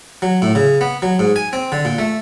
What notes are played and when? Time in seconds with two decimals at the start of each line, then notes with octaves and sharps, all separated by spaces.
0.22 F#3
0.42 A2
0.55 C#3
0.81 B3
1.02 F#3
1.19 G#2
1.36 G#5
1.53 C4
1.72 D3
1.85 A#2
1.99 A3